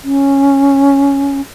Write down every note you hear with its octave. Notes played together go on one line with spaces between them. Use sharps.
C#4